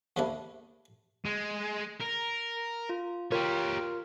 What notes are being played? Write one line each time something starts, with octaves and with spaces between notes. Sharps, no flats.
D#2 G#2 D3 A#3 D4 E4
G#3
A#4
F4
F4 G4 A#4 C#5